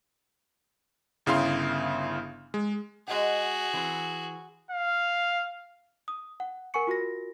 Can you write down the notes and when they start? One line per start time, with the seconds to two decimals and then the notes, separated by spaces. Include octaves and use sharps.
1.26 G1 C#3 E4 F5 C6 F6
2.54 G#3
3.08 G#3 F#4 G#4 D#5 F#5
3.73 E3 C4
4.71 F5
6.08 D#6
6.40 F#5
6.74 A#4 F#5 G#5 C#6 C#7
6.87 F4 F#4 A#4 A#6